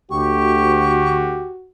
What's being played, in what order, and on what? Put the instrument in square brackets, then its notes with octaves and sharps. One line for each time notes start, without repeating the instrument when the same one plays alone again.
[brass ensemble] D2 [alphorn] F#4 [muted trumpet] G4 [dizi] C#6